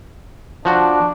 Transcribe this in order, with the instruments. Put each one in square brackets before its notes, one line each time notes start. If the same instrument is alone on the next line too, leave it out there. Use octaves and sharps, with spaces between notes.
[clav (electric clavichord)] F3 F#4 [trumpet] D4